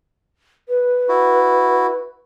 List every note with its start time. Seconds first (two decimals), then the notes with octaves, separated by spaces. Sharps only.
0.68 B4
1.09 E4 F#4